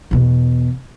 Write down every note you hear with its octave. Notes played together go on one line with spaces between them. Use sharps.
E2 B2